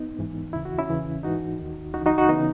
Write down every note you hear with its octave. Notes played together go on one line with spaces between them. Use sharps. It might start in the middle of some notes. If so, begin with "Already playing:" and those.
Already playing: B3 D#4
G#2 E3
D#2 C#3 E3 E4
F#4
C#4 E4
E2 C#3 E3
G#2 E3 D#4 F#4
D#2 D#3
C#2 C#3 E3 D#4 F#4
D#4 F#4
D#4 F#4
C#3 E3 B3 D#4